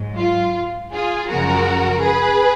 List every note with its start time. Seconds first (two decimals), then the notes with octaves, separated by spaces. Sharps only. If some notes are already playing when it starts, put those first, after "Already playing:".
Already playing: G#2 F#3
0.19 F4
0.92 F4 G#4
1.29 F#2 C#3 F3 G#3 F#4 A#4
2.02 G#4 B4